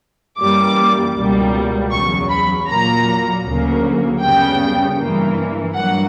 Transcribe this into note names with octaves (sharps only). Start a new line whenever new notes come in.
F#2 E3 G3 A#3 D6
C#2 B2 G3 A#3
E2 C#3 F#3 C#6
B5
A#2 F#3 A#3 A#5
D2 C#3 F#3 A#3
F#2 C#3 G3 B3 G5
G2 E3 A#3
G2 F#3 A#3 F#5